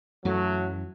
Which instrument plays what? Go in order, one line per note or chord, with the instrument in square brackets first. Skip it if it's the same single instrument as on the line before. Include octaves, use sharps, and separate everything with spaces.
[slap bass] F#2 E3 [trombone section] F#3 A3